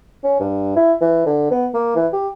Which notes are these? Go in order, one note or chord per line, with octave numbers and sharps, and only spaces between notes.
C#4
G2
E4
E3
D3
B3
A#3
E3
G4